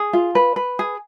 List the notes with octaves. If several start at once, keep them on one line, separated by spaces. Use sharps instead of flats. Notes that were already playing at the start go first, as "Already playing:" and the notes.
Already playing: G#4
F4
B4
B4
G#4